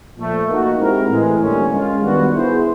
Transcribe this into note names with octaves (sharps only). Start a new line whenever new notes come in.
A#2 F3 A3
A#3 D#4 F#4
G#3 C4 E4 G4 A#4
A2 E3 G#3
D3 G3 A#3 C#4
G#3 C#4 F4
D#3 G3 B3 D4 F#4
B3 E4 G#4 C5